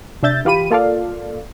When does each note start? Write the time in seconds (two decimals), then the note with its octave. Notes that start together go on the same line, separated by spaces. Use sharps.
0.23 C3 D4 E5 G6 A6
0.45 E3 F4 G4 B5 D#7
0.70 A#3 F4 A4 D5 F5